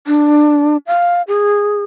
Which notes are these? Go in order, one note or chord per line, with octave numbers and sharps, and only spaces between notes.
D4
F5
G#4